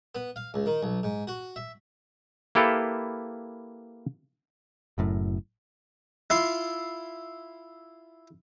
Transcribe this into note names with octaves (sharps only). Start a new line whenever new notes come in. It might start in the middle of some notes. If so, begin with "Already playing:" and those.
B3
F5
C#2
D#3
B1
G#2
F#4
E5
A#3 E4 G4 A4 B4 F5
F#1 F#2 A2
E4 F4 C6